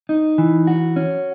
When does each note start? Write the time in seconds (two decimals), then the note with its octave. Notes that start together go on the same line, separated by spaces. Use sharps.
0.09 D#4
0.38 E3
0.67 F#4
0.96 C#4